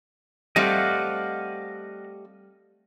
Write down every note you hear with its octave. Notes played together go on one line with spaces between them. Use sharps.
G3 A3 C4 D#5 F5 F#5